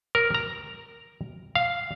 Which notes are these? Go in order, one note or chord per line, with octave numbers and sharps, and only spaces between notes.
A#4
A#5
F5